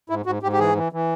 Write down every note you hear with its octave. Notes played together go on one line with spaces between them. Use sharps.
G#2 E4
G#2 F#4
G#2 G4
G4
E3 G#4
E3
E3